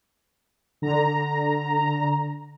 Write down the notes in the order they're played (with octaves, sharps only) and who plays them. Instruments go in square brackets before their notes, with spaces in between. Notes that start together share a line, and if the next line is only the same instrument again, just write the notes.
[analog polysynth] D3 A#5